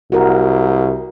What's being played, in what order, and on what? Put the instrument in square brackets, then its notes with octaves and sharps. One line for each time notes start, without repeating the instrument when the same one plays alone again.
[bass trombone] C2 [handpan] F#4 A#4